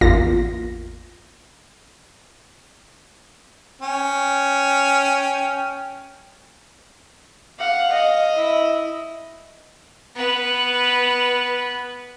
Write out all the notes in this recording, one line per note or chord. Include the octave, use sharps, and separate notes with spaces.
A1 E2 A#3 F4 A#6
C#4 G5
F5 F#5
D#5
E4
B3 B4